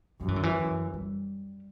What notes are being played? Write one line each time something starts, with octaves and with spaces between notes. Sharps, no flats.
F#2 F#3
E3
D3
E3
G3